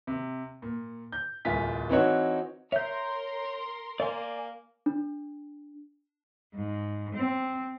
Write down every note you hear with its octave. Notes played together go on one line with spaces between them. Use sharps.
C3
A#2
G6
D1 C2 F4 G#5 B6
E3 C4 D#4 F#4 C#5
A#4 C#5 E5 C6 G6
A#3 D5 G#5
D4
G#2
C4